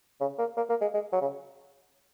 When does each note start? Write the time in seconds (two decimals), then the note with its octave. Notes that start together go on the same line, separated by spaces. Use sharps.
0.21 C#3
0.39 A#3
0.57 A#3
0.69 A#3
0.82 G#3
0.94 G#3
1.13 F#3
1.21 C#3